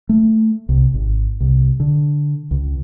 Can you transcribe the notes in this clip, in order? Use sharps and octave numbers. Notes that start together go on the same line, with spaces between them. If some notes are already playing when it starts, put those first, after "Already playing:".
A3
C2
G#1
C2
D3
C#2